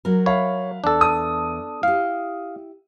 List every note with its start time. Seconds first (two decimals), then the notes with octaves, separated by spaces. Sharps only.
0.05 F#3 A#4
0.26 C#5 E5 F5 B5
0.84 E2 D4 A4
1.01 D#6
1.83 E4 G4 F5